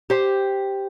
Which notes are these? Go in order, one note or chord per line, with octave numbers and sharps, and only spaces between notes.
G4 C5